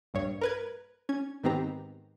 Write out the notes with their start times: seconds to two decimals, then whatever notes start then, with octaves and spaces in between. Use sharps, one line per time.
0.14 A#1 G2 C#5
0.41 A#4 B4 G#6
1.09 C#4 G#6
1.43 G#2 D#3 B3 C4 G4 A#5